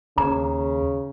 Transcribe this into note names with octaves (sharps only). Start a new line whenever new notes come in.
D#2 C#3 A#5